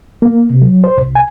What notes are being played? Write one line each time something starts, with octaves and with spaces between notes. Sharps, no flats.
A#3
C3
F#3
C5
C2
G#5